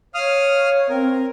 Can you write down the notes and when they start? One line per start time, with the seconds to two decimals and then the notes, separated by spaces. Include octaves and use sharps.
0.14 C#5 F5 D#6 F6
0.89 C4 A#4